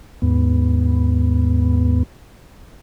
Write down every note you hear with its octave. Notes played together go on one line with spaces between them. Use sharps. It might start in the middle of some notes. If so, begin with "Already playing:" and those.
D#2 G#2 B3